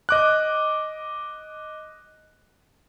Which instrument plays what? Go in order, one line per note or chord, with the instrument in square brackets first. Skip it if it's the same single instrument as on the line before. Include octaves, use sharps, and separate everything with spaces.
[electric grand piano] D#5 D6 F#6